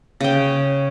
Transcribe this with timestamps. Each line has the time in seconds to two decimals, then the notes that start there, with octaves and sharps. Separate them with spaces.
0.20 C#3 G5